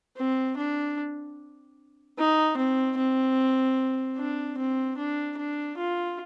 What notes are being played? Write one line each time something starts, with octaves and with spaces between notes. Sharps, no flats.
C4
D4
D#4
C4
C4
D4
C4
D4
D4
F4